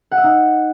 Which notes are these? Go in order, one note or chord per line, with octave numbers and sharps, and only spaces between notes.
F#5
E5
D#4